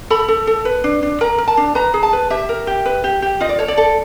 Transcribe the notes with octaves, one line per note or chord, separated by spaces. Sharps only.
A4 B5
A4
A4
B4
D4
D4
A#4 A#5
A#4
A5
D4
B4 A#5
G#4
A5
B4
G4 E5
A#4
G4
B4
G4
G4
F4 D#5
D5
A4 C#5
D5
A4